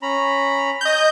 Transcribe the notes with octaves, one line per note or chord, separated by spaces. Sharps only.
C#4 A#5 B5
D#5 G6